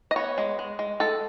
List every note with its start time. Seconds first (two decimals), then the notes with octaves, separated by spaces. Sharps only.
0.11 D#5
0.16 B3 C#5
0.38 G#3
0.59 G#3
0.79 G#3
1.00 G#3 A4